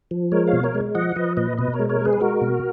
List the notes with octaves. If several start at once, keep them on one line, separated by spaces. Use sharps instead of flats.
F3
G#3 A#4 C#5
C#5 F5
B2
A#4 C#5
G#3
F3 D#5 F#5
F3 B4 D#5
A#2 B4 D#5
B2 B4 D#5
A#4 C#5
G#3
A#4 C#5
G#3 G#4 B4
B4
G#3 F#4 A#4
B2